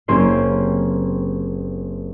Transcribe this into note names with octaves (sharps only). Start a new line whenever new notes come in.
F#1 A#3 C4 C#4 G4 C6